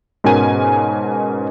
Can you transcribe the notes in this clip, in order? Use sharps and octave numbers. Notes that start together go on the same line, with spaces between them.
G#2 B2 C#4 A#4 G#5 D#7